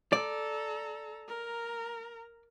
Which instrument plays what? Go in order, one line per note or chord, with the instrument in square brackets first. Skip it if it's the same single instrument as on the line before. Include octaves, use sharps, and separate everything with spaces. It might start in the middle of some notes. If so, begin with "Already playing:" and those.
[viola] A4 A#5 [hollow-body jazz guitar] D5
[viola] A#4 A#5